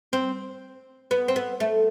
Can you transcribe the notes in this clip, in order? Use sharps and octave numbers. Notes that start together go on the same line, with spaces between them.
C4
B3
C4
B3
A3